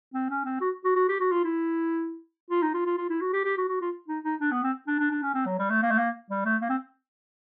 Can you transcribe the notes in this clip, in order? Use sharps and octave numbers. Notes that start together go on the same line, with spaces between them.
C4
C#4
C4
F#4
F#4
F#4
G4
F#4
F4
E4
F4
D#4
F4
F4
F4
E4
F#4
G4
G4
F#4
F#4
F4
D#4
D#4
D4
B3
C4
D4
D4
D4
C#4
C4
F#3
G3
A3
A#3
A3
A#3
G3
A3
A#3
C4